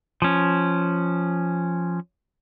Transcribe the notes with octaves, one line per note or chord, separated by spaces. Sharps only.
F3 C#4